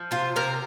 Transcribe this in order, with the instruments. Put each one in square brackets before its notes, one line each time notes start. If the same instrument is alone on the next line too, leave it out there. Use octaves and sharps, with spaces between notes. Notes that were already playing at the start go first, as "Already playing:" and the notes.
Already playing: [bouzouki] F3
C3 F4
C3 A#4